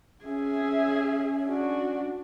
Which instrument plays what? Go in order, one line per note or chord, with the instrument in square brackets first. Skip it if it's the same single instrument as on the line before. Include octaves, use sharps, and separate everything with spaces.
[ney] C#4 [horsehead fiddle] G#4 E5
[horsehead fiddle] D4 F#4